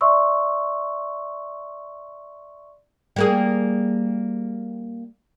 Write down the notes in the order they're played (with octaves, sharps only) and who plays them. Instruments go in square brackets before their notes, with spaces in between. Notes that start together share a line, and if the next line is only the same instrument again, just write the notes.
[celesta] D5 E5 C6 C#6 E6
[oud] G3 A#3 G#4